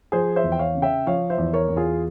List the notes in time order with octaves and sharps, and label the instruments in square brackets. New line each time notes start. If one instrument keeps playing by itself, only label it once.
[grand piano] F3 G#4 C5
C5 E5
E2
G5
C#5 F5
C#3
E5 G5
F3 C#5 F5
C5 E5
E2
A#4 C#5
E2
F4 G#4